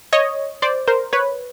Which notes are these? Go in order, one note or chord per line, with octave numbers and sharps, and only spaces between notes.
C#5 D#5
C5 D5
A#4 C5
B4 C#5